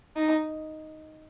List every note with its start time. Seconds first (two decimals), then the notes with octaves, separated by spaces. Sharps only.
0.16 D#4